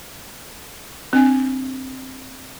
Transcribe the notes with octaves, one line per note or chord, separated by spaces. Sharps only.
C4 D4 G#5